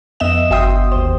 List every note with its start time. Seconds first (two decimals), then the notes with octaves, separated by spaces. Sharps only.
0.20 F2 B3 D#5 E5 E7
0.50 G1 F#4 E5 G5 C6 D#6
0.92 D#2 C5